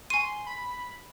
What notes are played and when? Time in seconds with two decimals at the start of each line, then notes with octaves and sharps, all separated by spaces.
0.10 G#5 C6 C#6 D#7
0.47 B5